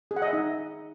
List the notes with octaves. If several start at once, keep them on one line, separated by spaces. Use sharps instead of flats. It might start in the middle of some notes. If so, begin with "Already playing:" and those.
G#4
F#5
D#5
E5
D#4